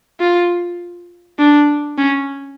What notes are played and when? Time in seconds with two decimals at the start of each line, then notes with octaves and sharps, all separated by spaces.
0.20 F4
1.39 D4
1.98 C#4